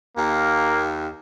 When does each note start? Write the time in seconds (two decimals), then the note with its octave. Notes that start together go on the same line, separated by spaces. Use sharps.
0.17 D#2 A#3